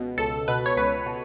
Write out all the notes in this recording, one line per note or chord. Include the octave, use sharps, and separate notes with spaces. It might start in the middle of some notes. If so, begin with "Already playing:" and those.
Already playing: C#2 B2
C#2 A4
B2 B4
C#5
C#2 B4
B2